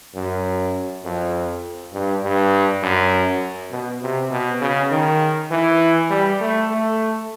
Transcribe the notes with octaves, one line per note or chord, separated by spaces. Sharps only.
F#2
F2
G2
G2
F#2
B2
C3
B2
C#3
D#3
E3
G3
A3
A3